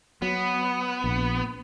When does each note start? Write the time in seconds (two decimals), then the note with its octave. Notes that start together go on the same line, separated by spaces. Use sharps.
0.22 F#3 B3
1.04 A#1